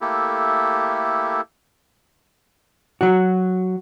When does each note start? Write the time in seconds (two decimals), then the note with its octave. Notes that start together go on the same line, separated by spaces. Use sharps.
0.01 A3 A#3 E4 G4 A4
3.01 F#3 F#4